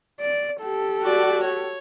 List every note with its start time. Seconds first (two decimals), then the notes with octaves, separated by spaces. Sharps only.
0.20 D5
0.61 G4 A4
1.04 F#4 D5
1.44 C#5